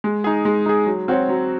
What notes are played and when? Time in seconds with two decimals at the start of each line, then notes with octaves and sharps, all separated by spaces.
0.04 G#3
0.24 D#4 G#4
0.45 G#3
0.66 D#4 G#4
0.86 F#3
1.08 C4 F#4 C#5
1.29 F#3